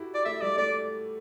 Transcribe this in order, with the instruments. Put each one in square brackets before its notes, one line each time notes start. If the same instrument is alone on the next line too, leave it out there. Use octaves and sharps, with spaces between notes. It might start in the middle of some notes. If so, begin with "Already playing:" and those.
Already playing: [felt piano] E4 F#4 G4 A4
[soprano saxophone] D5
[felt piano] A3 [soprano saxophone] E5
[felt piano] G3 [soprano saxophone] D5
[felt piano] A3 [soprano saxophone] D5